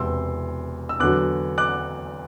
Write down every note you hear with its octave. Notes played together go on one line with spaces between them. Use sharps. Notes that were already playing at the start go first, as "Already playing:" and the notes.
Already playing: E1 E2 C3 C6 E6
E6
E2 D3 F#3 D6 F#6
D6 F#6